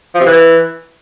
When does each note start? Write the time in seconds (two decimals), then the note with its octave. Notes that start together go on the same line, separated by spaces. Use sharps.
0.15 F3
0.20 C3
0.26 E3